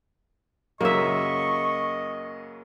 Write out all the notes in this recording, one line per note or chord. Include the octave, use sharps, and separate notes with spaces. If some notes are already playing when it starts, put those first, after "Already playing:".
F#2 C#3 F#3 A#3 D#5 E5 C#6